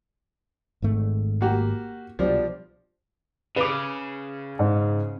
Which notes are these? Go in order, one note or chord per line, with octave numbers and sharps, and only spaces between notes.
G#1 G#2 A3
A#3 F#4 G4
C2 B2 F3 G3 D4
C#3 B4 D6
G#2